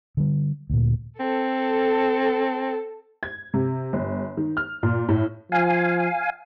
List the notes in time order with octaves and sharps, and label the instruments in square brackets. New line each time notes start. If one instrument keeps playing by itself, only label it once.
[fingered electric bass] D3 G3
D2 A#2
[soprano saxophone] C4 [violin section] A4
[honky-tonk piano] G#6
C3
G1
D#3
F6
A#2
A2
[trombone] F3 [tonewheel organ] F5 G#5